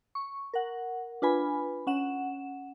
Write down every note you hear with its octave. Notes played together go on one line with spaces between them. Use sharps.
C#6
A#4 F#5
D4 F4 B4 G#5 B5
C#4 F#5 E7